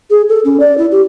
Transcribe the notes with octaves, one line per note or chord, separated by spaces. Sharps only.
G#4
A4
C#4
D5
E4
G4